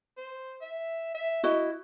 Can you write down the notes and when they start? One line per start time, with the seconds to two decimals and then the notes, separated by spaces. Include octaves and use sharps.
0.18 C5
0.61 E5
1.15 E5
1.44 E4 F#4 D#5